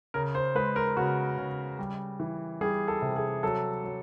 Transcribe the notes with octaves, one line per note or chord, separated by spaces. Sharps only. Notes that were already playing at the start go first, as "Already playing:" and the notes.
C#3 A#4
C5
G#3 B4
A#4
C#3 F#4
C#3
G3
E3
G3 G#4
A4
C3
G#4
F#3 A4
F#3